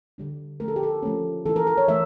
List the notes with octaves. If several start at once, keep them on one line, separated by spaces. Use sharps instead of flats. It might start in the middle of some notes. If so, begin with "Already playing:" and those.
D3 G3 D4
F3 A3 C#4 A#4
A4
G4
A4
F3 A3 C#4
E3 A3 E4 A4
A#4
A#4
C#5
E3 A3 E4 E5